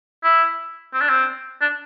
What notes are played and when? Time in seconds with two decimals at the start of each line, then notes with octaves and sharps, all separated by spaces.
0.24 E4
0.94 C4
1.01 D4
1.09 C4
1.61 D4